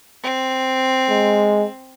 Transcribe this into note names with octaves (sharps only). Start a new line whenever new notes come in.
C4
G#3